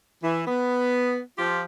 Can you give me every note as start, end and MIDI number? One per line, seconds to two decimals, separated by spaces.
0.24 0.43 52
0.47 1.18 59
1.38 1.63 53
1.38 1.63 65
1.38 1.63 67